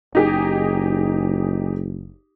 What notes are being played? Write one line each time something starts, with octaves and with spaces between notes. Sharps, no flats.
F#1 D#4 G4 G#4